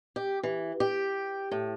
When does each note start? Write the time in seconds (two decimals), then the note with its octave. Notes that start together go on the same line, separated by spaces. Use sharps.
0.16 G4
0.43 E3
0.80 G4
1.52 A2